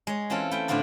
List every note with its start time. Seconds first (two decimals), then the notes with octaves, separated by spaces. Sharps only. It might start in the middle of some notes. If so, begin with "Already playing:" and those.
0.07 G#3 C#5
0.30 E3 C4 C#4 F4 A4
0.51 A3 E4 G5
0.68 A2 D3 C4 D4 F4 D5